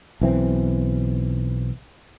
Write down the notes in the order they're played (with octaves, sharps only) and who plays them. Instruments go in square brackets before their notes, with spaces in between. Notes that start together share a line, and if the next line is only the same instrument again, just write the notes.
[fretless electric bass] B1 E3 C4